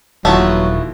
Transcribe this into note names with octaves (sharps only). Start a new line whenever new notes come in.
D#1 D#2 A#2 E3 F#3 A3 B3 F#4